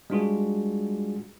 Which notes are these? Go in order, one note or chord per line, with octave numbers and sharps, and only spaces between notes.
G3 G#3 D4 F4 F#4 G#4